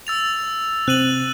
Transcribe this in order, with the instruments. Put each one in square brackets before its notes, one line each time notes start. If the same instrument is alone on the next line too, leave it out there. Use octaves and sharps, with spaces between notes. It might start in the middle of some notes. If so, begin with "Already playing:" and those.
[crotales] E6 A6 F7
[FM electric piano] C3 C4 [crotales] F#6 D#7 F#7